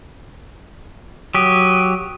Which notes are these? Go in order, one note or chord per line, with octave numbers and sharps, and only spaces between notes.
F#3 G4 D#6